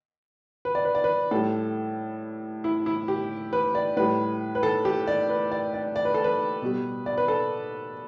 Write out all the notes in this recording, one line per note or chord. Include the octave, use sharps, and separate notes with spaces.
B4
D5
B4
D5
B4
A2 G3 A4
E4
E4
G4
B4
D5
A2 G3 B4
B4
A4
G4
D5
B4
D5
D5
D5
B4
A4
B4
B2 G3
D5
B4
A4